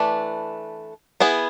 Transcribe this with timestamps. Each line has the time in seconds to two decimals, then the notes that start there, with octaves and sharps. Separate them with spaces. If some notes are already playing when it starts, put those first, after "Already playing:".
Already playing: E3 A3 D4 B4
1.20 B3 E4 G#4